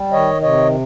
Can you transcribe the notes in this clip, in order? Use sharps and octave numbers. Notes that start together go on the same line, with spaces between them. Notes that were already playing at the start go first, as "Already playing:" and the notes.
Already playing: G3
D#3 C#5 D#5
C3 C#5 D#5